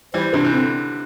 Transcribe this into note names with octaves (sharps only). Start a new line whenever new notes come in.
E3 G3 C5
C3 E3 D4
E3
D3 C4